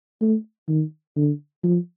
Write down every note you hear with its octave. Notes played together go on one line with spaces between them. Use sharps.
A3
D#3
D3
F3